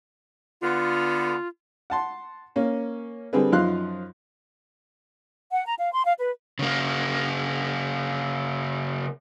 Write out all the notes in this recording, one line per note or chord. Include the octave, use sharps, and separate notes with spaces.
D3 B3 F4
F#5 A5 C6
A#3 C#4
D3 G3 C4 G#4 B4
F#2 F3 D#4 F5 C6 F#6
F#5
A#5
F5
C6
F5
B4
C#3 A#3